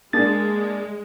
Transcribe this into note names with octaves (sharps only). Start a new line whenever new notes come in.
G#3 A#3 D4 G#4 A6